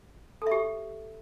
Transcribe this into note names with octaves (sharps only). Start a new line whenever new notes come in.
G4 A4 E5